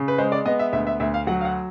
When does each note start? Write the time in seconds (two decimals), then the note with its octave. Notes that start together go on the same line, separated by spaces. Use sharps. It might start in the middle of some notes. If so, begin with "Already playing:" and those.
Already playing: C#3
0.08 B4
0.18 G#3 C5
0.32 D5
0.46 B3 D#5
0.59 E5
0.73 D2 E5
0.87 E5
1.00 D2 E5
1.14 F5
1.27 F#3 F#5
1.41 F5
1.45 F#5